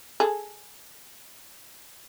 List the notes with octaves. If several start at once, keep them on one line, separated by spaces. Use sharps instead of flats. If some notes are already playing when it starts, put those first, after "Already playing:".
G#4 A4